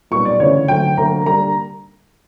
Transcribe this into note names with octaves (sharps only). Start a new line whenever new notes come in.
B1 A#2 G3 B3 C#6
D5
D2 C#3 E3 C#5
D2 D3 F#3 G5
D2 D3 F#3 A#3 A#5
D3 G3 A#3 A#5